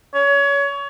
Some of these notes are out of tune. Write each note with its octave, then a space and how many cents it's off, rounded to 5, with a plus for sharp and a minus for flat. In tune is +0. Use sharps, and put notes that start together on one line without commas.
C#5 +25